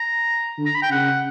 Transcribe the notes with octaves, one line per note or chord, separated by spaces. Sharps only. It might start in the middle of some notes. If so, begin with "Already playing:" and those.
Already playing: A#5
D3
A#5
B5
G5
C#3 F#5